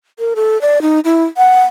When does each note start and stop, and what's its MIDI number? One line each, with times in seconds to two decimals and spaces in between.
0.19 0.34 70
0.36 0.60 69
0.61 0.82 74
0.82 1.00 63
1.05 1.24 64
1.37 1.64 78